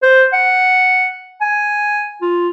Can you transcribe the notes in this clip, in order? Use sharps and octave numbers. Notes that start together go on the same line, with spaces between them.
C5
F#5
G#5
F4